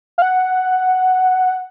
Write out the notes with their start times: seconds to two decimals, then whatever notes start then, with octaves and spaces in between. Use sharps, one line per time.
0.18 F5
0.22 F#5